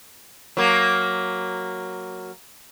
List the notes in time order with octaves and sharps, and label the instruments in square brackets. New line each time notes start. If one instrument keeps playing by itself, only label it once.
[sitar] F#3 A#3